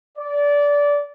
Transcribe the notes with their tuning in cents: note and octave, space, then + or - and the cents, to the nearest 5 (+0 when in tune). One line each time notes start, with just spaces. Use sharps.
D5 -20